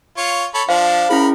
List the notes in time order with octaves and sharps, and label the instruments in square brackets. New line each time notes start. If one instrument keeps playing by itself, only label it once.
[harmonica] F4 C#5
A4 C#5 B5
[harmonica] F3 D4 [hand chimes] C5 F5
[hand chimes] C#4 E4 G#4 [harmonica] A#4 B5